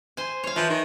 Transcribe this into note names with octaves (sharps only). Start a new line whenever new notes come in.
C5 G#5
C#5 F5
E3 F3
D#3